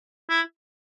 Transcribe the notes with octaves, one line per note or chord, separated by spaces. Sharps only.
E4